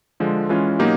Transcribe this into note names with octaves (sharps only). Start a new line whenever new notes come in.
D3 F3 G#3
E3 G#3 C#4 F4
B2 F#3 A#3 D#4 G4